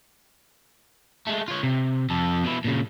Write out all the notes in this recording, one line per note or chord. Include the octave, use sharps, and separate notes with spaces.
G#3 A3
F4 C#5
C3
F2 A4
B2 E4
A#2 C#3